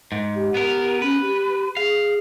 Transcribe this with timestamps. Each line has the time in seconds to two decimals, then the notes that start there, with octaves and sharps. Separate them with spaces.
0.12 G#2
0.35 G4
0.54 B3 A#4
1.02 C#4 B4
1.21 G4
1.77 G#4 F5